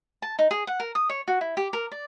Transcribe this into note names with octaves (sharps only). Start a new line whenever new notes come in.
A5
D#4
G#4
F#5
A#4
D#6
C#5
F#4
E4
G4
A#4
D5